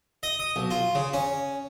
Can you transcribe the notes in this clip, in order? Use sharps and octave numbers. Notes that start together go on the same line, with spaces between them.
D#5
D#6
B1
F4
C#3
C#4